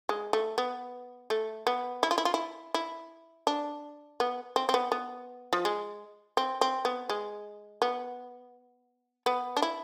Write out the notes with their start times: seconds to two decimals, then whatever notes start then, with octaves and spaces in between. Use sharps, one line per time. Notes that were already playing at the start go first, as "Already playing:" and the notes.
0.09 G#3
0.33 A3
0.58 B3
1.30 A3
1.67 B3
2.03 E4
2.11 F4
2.18 E4
2.25 F4
2.34 E4
2.74 E4
3.47 D4
4.20 B3
4.56 C4
4.69 C4
4.74 B3
4.92 B3
5.53 F3
5.65 G#3
6.37 C4
6.61 C4
6.85 B3
7.09 G#3
7.82 B3
9.26 B3
9.57 D4
9.62 E4